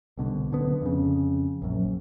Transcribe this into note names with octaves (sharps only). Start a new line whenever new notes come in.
C2 B2 D3
D1 D3 B3
F2 C#3
A#1 F#2